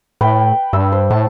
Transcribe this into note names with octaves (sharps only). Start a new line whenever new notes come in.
A2 B4 G5
G2 E6
C5
A2 A5